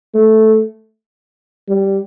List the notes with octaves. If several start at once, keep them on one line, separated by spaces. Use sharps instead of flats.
A3
G3